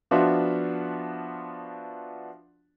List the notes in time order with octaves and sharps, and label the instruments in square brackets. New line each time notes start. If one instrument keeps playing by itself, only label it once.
[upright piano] F3 B3 D4 F4 F#4 E5